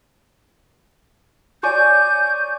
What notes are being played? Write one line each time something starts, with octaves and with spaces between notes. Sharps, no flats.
C#5 D5 G#5 G6